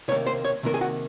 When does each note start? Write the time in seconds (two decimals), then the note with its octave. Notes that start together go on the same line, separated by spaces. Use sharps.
0.08 C3 D#3 A#3 C#5
0.26 C5
0.45 C#5
0.63 C3 D#3 A#3 A#4
0.74 G#4
0.81 F#4